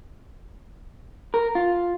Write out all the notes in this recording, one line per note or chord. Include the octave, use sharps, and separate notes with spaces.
A#4
F4